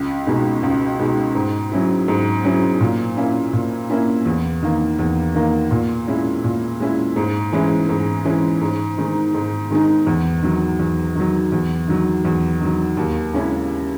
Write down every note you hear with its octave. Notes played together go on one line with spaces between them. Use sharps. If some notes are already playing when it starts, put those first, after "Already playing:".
Already playing: C#2
B2 G#3 D#4
C#2
B2 G#3 D#4
G#2
F#3 C#4 E4
G#2
F#3 C#4 E4
A#2
A#3 C#4 E4
A#2
A#3 C#4 E4
E2
D#3 A#3
E2
D#3 A#3
A#2
G#3 C#4 E4
A#2
G#3 C#4 E4
G#2
E3 G#3 C#4 E4
G#2
E3 G#3 C#4 E4
G#2
D#3 G#3 D#4
G#2
D#3 G#3 D#4
E2
D#3 F#3
E2
D#3 F#3
E2
D#3 F#3
E2
D#3 F#3
D#2
C#3 G#3 C#4 E4